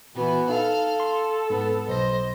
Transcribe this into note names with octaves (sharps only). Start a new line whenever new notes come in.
A#2 E3 B3 F#4
D#4 A4 F5
C6
G#2 B3
B1 C5 D#5 A#6